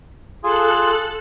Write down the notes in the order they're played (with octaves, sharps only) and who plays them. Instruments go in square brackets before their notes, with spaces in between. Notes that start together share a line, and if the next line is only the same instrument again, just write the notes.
[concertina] F4 G#4 [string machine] A4 F#6